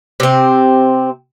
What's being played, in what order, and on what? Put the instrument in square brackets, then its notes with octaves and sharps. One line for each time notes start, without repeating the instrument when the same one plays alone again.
[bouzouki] C3 C4